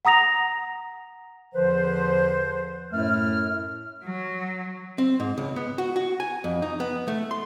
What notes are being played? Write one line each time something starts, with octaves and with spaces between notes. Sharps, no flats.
F#5 A#5 D#6 A#6 F7
E2 D3 F3 B4 C5
F#2 A2 A3 E4 F6
F#3
C4
G#2
C#2
B3
F#4
F#4
G#5
F2
D#4
B3
A3
C6